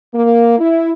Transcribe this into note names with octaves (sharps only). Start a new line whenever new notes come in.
A#3
E4